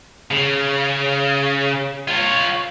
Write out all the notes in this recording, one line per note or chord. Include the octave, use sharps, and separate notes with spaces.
C#3
F4 C#5